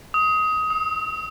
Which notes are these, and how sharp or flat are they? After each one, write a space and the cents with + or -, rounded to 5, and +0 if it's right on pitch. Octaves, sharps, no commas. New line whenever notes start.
D#6 +20
D#6 +45